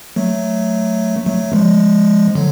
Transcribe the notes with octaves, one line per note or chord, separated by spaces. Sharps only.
F#3 A3
F#3 A3
F3 G#3
D3 F#3